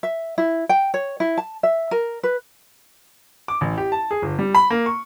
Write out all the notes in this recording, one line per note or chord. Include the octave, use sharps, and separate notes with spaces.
E5
E4
G5
C#5
E4
A5
E5
A#4
B4
D6
A1
G4
A5
G#4
G1
G3
B5
A#3
C#6